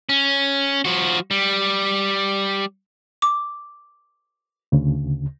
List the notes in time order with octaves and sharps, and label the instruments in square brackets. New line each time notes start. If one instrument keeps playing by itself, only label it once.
[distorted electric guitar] C#4
F3 F#4
G3
[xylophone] D6
[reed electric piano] D2 C#3